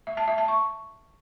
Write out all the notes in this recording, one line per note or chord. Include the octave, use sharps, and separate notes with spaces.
E5
A5
E5
A5
C#6